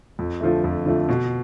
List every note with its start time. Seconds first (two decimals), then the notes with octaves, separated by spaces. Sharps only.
0.19 F2
0.41 D3 F3 A3
0.64 F2
0.86 D3 F3 A3
1.09 B2